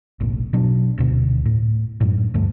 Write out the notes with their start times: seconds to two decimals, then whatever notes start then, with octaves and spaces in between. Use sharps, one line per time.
0.20 F#1 B1 A2
0.53 B2 F#3 D4
0.98 D#1 D2 B2
1.45 A2
2.00 F#2 A2
2.34 D2 G2 G3 A3